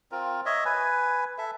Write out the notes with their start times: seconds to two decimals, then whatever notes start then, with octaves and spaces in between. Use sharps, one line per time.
0.11 C4 F4 A#4
0.46 C#5 D#5 E5
0.65 B4 G#5
1.38 A4 E5